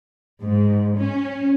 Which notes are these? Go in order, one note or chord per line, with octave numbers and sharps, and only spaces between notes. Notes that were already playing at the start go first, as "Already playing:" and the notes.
G#2
C#4